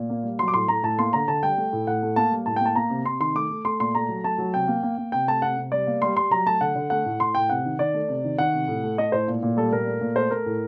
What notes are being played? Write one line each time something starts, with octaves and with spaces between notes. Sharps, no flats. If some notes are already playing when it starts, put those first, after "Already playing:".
Already playing: A#2
A#3
G3
F#3 C6
D6
A2 C6
A3 A#5
A2 A5
A#3 C6
D3 A#5
D3 A5
G3 G5
A3
A2
A2 F#5
A3
A#3 A5
G3
A2 A5
A#3 G5
A5
A#3 A#5
C3
C3 C6
D#3 C6
A3 D6
A3
A3 C6
A#2 C6
A3 A#5
F#3
A3 A5
F#3
C3 G5
A#3
A#3
A#3
C3 G5
A3 A5
C3 F#5
C3
G3 D5
A#3
G3 C6
G3 C6
F#3 A#5
A3 A5
D3 F#5
D3
A3 F#5
A2
A2 C6
A2 G5
C3 F#5
D#3
D#3 D5
A3
C3
D#3
D#3 F#5
C3
A2
A3
A3 D#5
A2 C5
A#2
A#2
G3 A4
A#2 A#4
A3
A#2
A3 C5
A3 A#4
A2